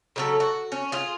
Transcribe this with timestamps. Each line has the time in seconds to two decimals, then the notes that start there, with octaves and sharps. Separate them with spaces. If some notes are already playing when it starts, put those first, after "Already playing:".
0.16 C#3 F#3 A4
0.40 F#4
0.72 C#4
0.92 F4 G#4